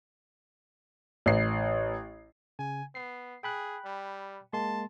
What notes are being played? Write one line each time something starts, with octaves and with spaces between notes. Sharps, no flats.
A1 C7
C#3 G#5
B3 C7
G#4 G5 B5 F#6
G3
G#3 A#3 A5 C6